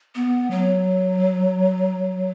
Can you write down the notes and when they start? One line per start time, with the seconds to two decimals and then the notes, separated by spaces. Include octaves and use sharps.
0.15 B3
0.51 F#3